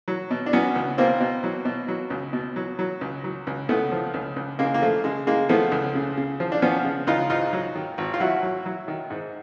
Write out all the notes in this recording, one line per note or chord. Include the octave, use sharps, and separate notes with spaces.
F#3
B2
D4
F#3 B3 C#4
C#2
B2 A#3 C4
B2
F#3
B2
F#3
C#2
B2
F#3
F#3
C#2
F#3
C#2
C#2 A3 B3
F3
C#2
C#2
C#3 G#3 A#3
A#3
F3 A3
C#3 G#3
C#3 G#3 A#3
F3 A3 B3
C#2
C#3
C#3
F3
D4
F3 B3 C#4
C#3
C#2 D#4 F4
G#2 D#4 F4
F#3
D#3
G#1
F4
F#3 E4 F#4
F#3
F#3
D#3
G#2